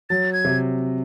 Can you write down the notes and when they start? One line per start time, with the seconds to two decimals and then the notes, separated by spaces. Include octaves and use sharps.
0.10 F#3 A6
0.33 G#6
0.45 C3